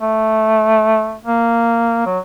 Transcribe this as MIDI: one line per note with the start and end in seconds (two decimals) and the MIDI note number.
0.01 1.17 57
1.25 2.06 58
2.07 2.19 54